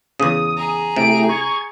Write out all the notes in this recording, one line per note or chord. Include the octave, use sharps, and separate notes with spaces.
E2 C#3 D#6
G#4 A#5
C3 A3 E4 G4 D7
C#6 G#6